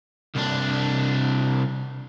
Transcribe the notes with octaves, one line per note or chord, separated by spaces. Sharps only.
C2 D4